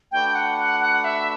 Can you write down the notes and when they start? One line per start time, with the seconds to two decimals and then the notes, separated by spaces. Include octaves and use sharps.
0.12 A3 D4 F#4 B4 D5 G5
0.35 F#5
0.58 F#5
0.80 F#5
1.04 E5